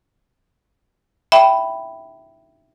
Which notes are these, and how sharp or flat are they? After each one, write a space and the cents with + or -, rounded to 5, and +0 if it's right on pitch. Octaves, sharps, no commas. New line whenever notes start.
E5 +0 G5 -10 B5 +0